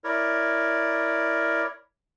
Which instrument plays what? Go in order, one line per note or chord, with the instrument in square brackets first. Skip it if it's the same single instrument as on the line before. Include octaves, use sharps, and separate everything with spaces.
[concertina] E4 A#4 C#5 D5